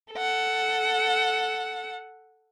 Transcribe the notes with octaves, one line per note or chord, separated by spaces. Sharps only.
A4 F#5